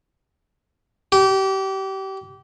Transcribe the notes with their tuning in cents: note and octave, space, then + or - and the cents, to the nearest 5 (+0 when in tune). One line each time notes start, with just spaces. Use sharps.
G4 -30